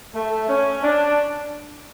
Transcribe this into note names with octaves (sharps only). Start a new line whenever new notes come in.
A3
C#4
D4